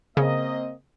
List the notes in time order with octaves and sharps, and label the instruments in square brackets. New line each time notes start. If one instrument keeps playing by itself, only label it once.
[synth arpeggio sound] C#3 [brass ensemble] A#3 C4 D#5